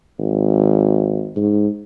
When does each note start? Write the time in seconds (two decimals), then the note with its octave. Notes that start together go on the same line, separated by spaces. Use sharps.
0.19 G#1
1.36 G#2